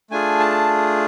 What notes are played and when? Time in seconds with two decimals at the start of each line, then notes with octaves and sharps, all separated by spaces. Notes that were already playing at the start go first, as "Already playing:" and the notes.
0.10 A3 D4 F4 G#4 G#5
0.39 A5